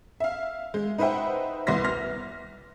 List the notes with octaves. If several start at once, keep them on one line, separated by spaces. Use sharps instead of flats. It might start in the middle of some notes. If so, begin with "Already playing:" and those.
E5 F5
G#3
D#4 B4 C5 E5 F#5 G5
C2 B3 E5 C6 A#6 B6
F6 A#6